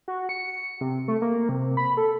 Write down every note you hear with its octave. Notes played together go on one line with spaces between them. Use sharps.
F#4
C#7
C3
A3
A#3
C3
B5
A4